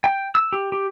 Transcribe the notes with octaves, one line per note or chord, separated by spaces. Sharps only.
G5
E6
G4
G4